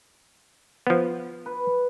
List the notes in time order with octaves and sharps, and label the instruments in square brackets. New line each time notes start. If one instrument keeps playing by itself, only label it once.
[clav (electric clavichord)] F3 B3
[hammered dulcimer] B4